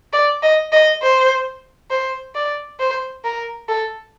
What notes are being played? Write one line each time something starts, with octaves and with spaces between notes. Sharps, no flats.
D5
D#5
D#5
C5
C5
D5
C5
A#4
A4